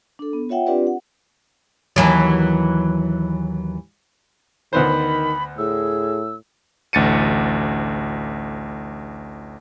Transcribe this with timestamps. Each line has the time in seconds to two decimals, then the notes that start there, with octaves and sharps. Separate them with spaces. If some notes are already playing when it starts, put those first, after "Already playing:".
0.19 D4 A4
0.33 B3
0.49 F4 C#5 E5 F#5 G5
0.67 C4 D4 F4 G4 B4 D5
0.87 F#5
1.96 D#2 E3 F#3
4.73 D2 D#3 B3 C5 B5
5.58 A2 G#4 E6
6.93 A1 D2 A6 C#7 D#7